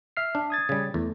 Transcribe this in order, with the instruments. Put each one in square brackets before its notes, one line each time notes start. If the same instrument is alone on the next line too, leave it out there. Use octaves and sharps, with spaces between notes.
[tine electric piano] E5 F6 C7
[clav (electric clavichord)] D4
[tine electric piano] D#6 G#6 A6
[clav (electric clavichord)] C#3 G3
[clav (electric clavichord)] E2 [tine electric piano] A3